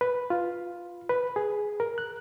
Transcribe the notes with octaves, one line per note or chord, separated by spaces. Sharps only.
B4
F4
B4
G#4
A#4
F#6